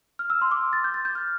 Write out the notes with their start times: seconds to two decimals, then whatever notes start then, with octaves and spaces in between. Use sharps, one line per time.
0.19 F6
0.30 E6
0.41 C6
0.51 D6
0.73 A6
0.84 G6
0.94 A6
1.05 G6
1.15 F6